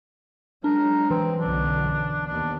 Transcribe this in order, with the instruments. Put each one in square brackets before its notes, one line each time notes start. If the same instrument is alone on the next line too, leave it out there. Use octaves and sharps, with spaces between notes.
[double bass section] F#3 G#3 [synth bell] D4 [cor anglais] A#4
[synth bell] E3 [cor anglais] C4
[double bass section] B1 F#2 D3 [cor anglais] D4
[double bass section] D#2 B3 [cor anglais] D4